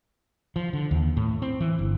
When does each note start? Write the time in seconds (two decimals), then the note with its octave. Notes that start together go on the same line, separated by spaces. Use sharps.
0.56 F3
0.73 D3
0.91 D#2
1.17 A2
1.42 C4
1.60 E3
1.79 G1